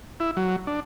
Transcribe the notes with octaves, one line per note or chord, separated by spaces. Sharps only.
E4
F#3
D4